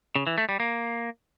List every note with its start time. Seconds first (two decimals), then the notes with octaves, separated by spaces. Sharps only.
0.16 C#3
0.27 E3
0.38 A3
0.49 G3
0.60 A#3